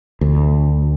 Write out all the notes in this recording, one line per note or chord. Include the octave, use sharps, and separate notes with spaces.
D2